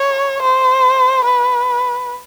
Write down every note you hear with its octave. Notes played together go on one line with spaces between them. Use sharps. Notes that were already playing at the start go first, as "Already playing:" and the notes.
Already playing: C#5
C5
B4